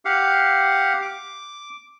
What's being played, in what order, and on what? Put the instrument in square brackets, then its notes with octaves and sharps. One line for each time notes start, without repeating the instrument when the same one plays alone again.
[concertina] G4 F5 F#5
D6